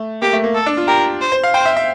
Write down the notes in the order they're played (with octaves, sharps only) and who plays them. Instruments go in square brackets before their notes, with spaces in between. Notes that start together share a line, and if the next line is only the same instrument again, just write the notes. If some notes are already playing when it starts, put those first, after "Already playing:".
Already playing: [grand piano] A3
[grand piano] A#3 [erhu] G4
[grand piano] A3
A#3
[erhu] A4
[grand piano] D4
F4
[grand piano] G4 [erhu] A#4
[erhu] C5
[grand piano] C5
F5
[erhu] C5 [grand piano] G5
[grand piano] E5
E5